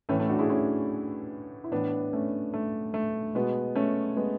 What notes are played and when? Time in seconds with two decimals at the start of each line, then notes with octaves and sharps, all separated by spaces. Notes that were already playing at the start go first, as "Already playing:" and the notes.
0.09 A2 E3 A3 C#4
0.19 A3 C#4
0.29 D4 F#4
0.39 E4 G#4
0.50 C#4 E4
1.64 E4
1.71 A2 E3 B3 D4
2.13 A3 C#4
2.54 A3
2.94 A3
3.35 B2 G#3 B3
3.75 A3 C#4
4.16 G#3 B3